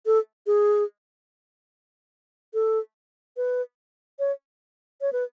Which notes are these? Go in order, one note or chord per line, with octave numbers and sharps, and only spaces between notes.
A4
G#4
A4
B4
C#5
C#5
B4